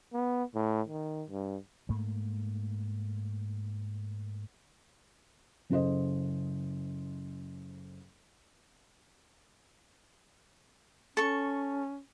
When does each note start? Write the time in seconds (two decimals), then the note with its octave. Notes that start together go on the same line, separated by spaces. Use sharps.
0.13 B3
0.55 A2
0.88 D#3
1.30 G2
1.89 G#2 A3 A#3
5.70 F#1 C#3 A4 C5 D#5
11.17 C#4 A4 C#6